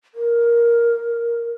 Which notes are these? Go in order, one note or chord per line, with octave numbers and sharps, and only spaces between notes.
A#4